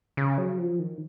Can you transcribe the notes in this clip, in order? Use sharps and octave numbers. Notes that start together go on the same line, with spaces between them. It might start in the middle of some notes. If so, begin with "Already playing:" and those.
C#3
F#3
F3
D#3